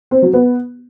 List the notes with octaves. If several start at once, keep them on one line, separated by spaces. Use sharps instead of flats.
C4
F#3
B3